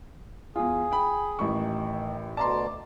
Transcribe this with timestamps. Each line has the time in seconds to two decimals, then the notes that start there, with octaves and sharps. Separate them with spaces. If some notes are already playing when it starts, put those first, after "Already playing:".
0.56 E2 F4 G#4
0.92 G5 B5
1.39 A1 D#3 E4 C#6
2.37 D2 B2 D5 A5 A#5 C6